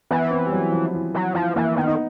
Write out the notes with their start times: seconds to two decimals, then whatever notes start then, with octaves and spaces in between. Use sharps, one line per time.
0.11 E3 B3
0.31 C4
0.47 G3
0.52 F#3
0.72 F3
0.94 E3
1.14 F#3
1.34 E3 F3
1.56 E3 A#3
1.76 D#3 B3
1.87 D#4